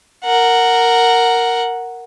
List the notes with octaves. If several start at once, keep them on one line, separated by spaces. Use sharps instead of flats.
A#4 F#5